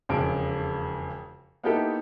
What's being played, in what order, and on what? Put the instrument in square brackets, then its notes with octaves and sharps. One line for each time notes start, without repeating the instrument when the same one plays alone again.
[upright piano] E1 F2 C#3 D7
A#3 B3 D#4 E4 G4 A4